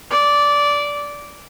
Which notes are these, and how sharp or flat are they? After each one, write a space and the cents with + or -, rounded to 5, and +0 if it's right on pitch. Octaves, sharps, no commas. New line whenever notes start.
D5 -15